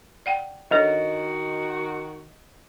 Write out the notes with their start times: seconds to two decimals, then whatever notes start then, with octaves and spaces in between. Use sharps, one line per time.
0.26 D5 F#5 G5
0.71 D#3 D4 F#4 A4 C#5 D#5